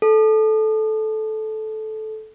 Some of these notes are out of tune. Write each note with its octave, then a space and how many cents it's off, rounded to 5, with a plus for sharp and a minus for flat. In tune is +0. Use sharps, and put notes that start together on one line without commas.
A4 -15